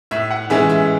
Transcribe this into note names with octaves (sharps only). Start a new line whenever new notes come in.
A2 E5
F#5
E3 G#3 C#4 E5
E5